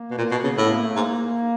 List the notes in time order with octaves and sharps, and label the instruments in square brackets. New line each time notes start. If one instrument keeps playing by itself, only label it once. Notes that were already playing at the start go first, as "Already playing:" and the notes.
Already playing: [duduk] A#3
[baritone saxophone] B2
A#2
B2
C#3
[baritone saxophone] A2 [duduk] B3
[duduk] A#3
A3
[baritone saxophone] G#2 [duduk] A#3